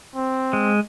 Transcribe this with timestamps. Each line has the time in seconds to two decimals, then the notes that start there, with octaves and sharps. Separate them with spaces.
0.16 C4
0.53 G#3